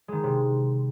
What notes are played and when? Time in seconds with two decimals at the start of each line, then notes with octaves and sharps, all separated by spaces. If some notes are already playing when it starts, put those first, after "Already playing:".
0.08 D#3 G#3
0.24 C3